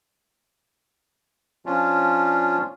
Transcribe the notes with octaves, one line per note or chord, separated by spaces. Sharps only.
F3 C#4 D4 F4